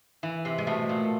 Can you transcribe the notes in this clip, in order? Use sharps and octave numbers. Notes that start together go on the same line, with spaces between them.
E3
C3
G#3
B2 A3
A#2